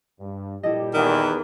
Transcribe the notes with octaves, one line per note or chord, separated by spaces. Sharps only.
G2
A#2 G3 E4 G4 A4 D#5
E2 D#3